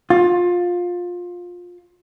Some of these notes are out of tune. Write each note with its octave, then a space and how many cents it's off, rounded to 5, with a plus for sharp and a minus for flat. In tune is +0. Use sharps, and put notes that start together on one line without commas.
F4 +20